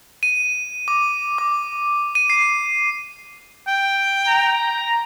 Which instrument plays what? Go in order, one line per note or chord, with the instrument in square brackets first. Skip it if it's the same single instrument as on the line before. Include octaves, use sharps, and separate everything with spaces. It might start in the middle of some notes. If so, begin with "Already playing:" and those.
[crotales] D#7
D6
D6
D#7
C7
[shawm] G5
[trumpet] A#5